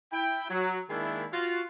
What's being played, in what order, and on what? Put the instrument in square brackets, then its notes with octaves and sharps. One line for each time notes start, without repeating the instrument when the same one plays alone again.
[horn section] E4 G5
F#3
D#3 G#3 A#3 D4 E4
F4 F#4